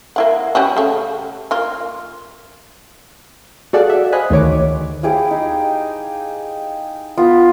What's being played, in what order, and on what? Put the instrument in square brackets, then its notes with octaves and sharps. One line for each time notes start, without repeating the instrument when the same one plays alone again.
[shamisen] A#3 E4 F#5
G3 C#4 F#4
C#3 A3
A#3 F4
[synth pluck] F#4 G#4 A4 D5 F5 F#5
E5
C5 D#5 F5 G#5 B5 F#6
D2 D#3 C#5 D6
[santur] E4 G4 G#4 F5
D#4
B3 F4